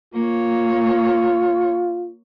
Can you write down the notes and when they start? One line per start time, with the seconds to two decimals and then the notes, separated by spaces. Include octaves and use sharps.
0.14 A#3 F4 C#5